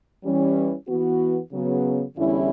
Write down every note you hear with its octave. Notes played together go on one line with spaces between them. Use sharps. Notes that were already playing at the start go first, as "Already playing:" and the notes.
E3 G3 C#4
E3 B3 F#4
C#3 F#3 B3
E2 D3 G3 C#4 E4